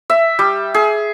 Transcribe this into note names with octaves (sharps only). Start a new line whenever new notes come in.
E5
G3
G#4